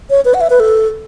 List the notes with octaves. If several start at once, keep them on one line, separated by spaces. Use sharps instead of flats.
C#5
B4
F#5
E5
B4
A4